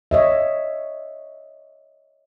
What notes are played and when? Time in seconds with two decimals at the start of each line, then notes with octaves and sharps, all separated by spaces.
0.11 C#5 D#5 E5